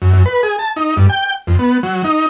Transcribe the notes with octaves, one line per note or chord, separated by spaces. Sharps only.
F#2
F#2
B4
G#4
A5
D#4
G2
G5
F2
B3
F#3
D#4